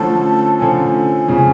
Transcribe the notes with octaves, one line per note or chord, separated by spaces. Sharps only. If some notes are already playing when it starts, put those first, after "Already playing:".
Already playing: D3 F3 A3 C#4 A5
D3 F3 A3 C#4 G#5
F2 C#3 F3